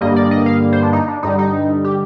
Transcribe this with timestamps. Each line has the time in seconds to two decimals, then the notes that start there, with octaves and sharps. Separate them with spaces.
0.01 G2 D3 G3 A#3 D#5
0.16 D5
0.31 D#5
0.46 F5
0.73 C5
0.83 D4
0.93 D#4
1.08 D4
1.23 G2 D3 G3 D#4
1.39 D#4
1.85 G4